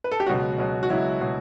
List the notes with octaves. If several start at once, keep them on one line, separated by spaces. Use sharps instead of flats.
B4
A4
G4
C#2 B2 F#3 F#4
C#2 B2 F#3
F#4
C#2 B2 F#3 E4
B2 F#3